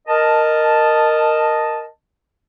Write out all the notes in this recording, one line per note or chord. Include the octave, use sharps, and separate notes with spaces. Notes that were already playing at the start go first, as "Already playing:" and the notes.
A#4 D#5 A5